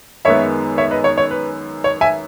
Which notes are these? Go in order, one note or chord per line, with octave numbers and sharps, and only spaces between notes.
F#2 D#3 G#3 B3 C#5 E5
C#5 E5
B4 D#5
C#5
C#5
B4
C#5
E5 G#5